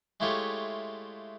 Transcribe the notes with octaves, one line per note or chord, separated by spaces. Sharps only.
G#3 A3 E4 F4 G4 C#5